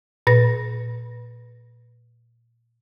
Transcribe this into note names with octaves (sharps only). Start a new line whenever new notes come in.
A#2 B4 A#6